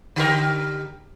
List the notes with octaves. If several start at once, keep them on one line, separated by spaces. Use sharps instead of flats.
D3 G4 A#4